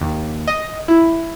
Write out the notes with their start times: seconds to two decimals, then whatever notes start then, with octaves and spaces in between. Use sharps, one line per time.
0.01 D#2
0.47 D#5
0.88 E4